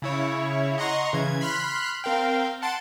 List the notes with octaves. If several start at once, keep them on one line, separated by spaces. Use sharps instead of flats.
C#3 E4 C#5
D#5 F#5 A#5 C6 C#6
C#3 E3 G#6
B5 C6 F6 F#6 B6
C4 A#4 F5 G5
F#5 A5 C6 A6 D7